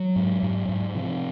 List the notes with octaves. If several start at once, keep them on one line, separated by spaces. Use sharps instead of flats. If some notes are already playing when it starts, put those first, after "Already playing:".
Already playing: F#3
G#2
G#2
G#2
C3 F3